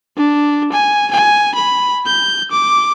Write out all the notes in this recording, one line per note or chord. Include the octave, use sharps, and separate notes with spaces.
D4
G#5
G#5
B5
G6
D6